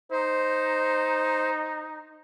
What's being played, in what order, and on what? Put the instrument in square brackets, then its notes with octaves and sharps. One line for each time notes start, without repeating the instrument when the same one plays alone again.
[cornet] D#4 [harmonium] C5